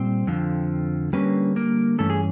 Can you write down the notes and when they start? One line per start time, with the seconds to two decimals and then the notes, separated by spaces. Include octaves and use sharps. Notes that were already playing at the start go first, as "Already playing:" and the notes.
Already playing: A#2 G3 C4 C5
0.27 F2 D3 F3
1.13 D3 G3 A#3 C#4 B4
1.56 A#3 A#4
1.98 G2 E3 A3 C#4 A4
2.10 G#4